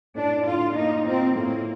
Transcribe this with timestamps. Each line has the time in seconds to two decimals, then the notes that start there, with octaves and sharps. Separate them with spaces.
0.15 A2 D4
0.45 A2 F4
0.75 A#3 D#4
1.06 C4 F4
1.36 A2 A#3